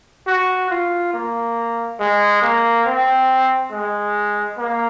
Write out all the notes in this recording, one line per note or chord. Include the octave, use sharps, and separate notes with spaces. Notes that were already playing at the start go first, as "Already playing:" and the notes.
F#4
F4
A#3
G#3
A#3
C4
G#3
A#3